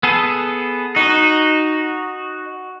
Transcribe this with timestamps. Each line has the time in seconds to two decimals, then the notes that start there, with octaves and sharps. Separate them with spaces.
0.03 B3 G#4 A4
0.96 D#4 F#4